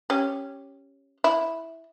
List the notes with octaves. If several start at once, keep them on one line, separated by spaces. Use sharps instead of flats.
C#4 G4
E4